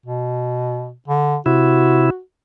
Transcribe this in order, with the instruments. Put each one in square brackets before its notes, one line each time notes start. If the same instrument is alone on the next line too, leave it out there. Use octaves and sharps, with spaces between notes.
[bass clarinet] B2
D3
[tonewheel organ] C3 E4 [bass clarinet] F#4